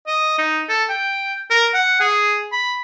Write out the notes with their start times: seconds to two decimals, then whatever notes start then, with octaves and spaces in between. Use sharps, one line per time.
0.07 D#5
0.38 D#4
0.69 A4
0.89 G5
1.51 A#4
1.74 F#5
2.00 G#4
2.52 B5